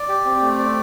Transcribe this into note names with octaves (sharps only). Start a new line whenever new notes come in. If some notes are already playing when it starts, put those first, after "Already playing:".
Already playing: D5
G4
C4
A3
D5